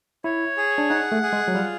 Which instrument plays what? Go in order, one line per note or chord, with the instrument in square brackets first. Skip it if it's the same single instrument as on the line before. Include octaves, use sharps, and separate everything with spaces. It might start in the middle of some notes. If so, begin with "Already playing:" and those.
[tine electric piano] E4 [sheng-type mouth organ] C#5
[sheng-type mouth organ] G#4
[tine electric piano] D4
[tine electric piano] D#4 [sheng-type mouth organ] F#5
[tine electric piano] A3
[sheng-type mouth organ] G#4
[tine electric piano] G#3
F#3
[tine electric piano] G3 [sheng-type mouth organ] F4